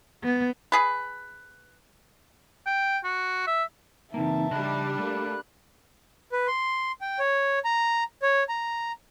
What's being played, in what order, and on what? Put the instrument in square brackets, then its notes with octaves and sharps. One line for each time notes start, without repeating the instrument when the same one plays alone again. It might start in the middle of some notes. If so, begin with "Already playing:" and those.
[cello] B3
[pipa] G#4 B4
[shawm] G5
F#4
E5
[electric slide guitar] C#3 A#3 [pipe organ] E3 C4 D#4 [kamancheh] E5 A5
[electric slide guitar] C#3 D#4 D#5 [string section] G3 D4 [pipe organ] B5 F#6
[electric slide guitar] A3 [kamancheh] A#3
[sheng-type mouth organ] B4
C6
G5
C#5
A#5
C#5
A#5